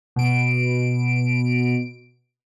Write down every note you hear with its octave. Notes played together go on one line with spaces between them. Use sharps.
B2 D7